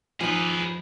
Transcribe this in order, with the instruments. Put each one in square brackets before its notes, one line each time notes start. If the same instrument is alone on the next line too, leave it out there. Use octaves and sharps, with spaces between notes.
[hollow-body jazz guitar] F3 D#4 [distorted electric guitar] G#4 B4